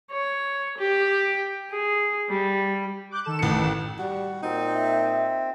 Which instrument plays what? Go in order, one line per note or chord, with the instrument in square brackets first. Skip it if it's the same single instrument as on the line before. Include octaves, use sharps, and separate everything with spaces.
[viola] C#5
G4
G#4
G3
[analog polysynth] D6 F#6 G6
D#3 A4 E7
[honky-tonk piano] A1 C#7
[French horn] G3 [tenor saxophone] F#4
[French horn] A#2 [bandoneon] C4 [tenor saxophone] D#4
[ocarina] E5